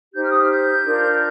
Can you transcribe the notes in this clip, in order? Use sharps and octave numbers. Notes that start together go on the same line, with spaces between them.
D#4 G4 C5 G6
F6
D#6
F6
G6
D4 F4 A#4